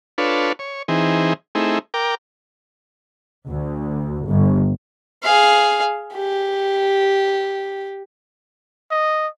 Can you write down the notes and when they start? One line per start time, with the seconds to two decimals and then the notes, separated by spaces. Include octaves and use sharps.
0.18 D4 F4 A4 B4 C#5
0.59 C#5
0.88 E3 C4 D#4 G#4
1.55 A3 C4 D#4 E4 G#4
1.94 A#4 G5 D6
3.50 D2
4.26 G1
5.23 G#4 F5
6.14 G4
8.91 D#5